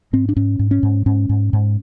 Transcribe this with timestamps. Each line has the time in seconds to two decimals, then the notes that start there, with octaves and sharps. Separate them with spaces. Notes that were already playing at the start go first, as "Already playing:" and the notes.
0.13 G#2 C4
0.29 D4
0.36 G#2 C#4
0.59 G#2
0.71 C#4
0.83 G#2
1.06 G#2 C#4
1.29 G#2
1.53 G#2